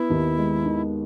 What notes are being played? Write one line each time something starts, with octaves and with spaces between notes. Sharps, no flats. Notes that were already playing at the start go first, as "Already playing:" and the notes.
Already playing: B3 E4
D#2
G#3
D#3